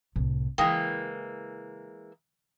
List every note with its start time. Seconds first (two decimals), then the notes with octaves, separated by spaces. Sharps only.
0.16 C2 A2
0.58 C#3 E3 G#3 A#3 G5 D#6 A#6